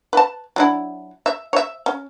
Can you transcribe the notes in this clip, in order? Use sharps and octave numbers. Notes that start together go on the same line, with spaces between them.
B4 A5
F#3 D4 E4
E5
C#5 E5
C#4